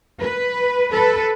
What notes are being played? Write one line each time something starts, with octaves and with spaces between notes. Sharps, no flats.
B4
A4 B4